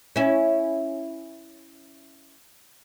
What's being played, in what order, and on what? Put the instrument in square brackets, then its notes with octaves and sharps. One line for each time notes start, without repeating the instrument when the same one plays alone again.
[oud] C#4 E4